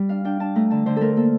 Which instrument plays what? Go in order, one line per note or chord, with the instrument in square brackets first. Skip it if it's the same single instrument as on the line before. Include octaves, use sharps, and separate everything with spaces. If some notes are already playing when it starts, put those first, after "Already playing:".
Already playing: [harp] G3
D4 F5
D4 G5
D4 A5
A3 A#5
D3 A5
D3 C5
A3 A4 A#4
A#3 A4